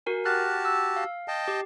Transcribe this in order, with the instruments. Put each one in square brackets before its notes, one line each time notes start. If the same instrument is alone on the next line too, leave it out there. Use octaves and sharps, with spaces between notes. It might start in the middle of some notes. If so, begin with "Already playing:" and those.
[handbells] F#4 A#4 G#5
[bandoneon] F#4 G4 A5 [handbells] F6 F#6 A6
[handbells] E6
F5
[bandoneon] D#5 G5 A5
[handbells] G4